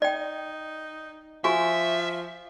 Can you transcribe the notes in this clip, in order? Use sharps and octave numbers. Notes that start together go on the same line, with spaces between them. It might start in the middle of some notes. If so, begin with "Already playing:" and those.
D#4 D5 G5
F3 F#4 E5 G#5 C#6